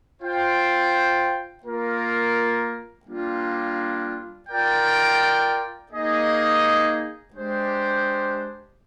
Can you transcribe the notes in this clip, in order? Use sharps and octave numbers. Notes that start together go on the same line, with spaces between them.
F4 C5 G5
A#3 F4 A#4
G3 A#3 D4 F4
F4 A#4 D5 G5
A#3 D#4 G#4 D#5
G#3 D4 G4 C5